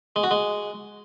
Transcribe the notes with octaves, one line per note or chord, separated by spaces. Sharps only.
G#3
F#4
G#3